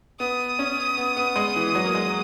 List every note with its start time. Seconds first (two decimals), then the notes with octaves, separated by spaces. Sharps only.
0.20 B3 D#6
0.59 C#4
0.98 B3
1.16 B3
1.36 G#3
1.56 E3
1.75 F#3
1.85 A#3
1.94 G#3